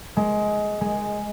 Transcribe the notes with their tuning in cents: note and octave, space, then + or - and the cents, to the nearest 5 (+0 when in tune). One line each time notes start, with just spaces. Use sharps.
G#3 +15
G#3 +0